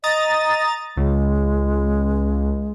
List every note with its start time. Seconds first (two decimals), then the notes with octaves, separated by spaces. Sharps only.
0.04 D#5 A#5 D#6 A6
0.97 C#2 G#3